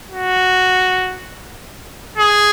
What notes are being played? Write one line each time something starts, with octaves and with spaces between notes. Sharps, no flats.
F#4
G#4